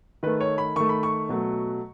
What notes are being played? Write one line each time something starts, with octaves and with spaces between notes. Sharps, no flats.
D#3 A3 B4
C#5
B5
D#3 A3 C#6
B5
C#6
B2 F#3 A3